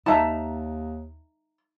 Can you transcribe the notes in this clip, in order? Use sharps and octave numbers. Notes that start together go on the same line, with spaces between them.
D#2 D#4 E5 A5 A#5